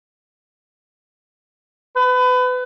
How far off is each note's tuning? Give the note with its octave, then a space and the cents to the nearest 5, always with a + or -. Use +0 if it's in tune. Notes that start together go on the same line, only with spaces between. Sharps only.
B4 +30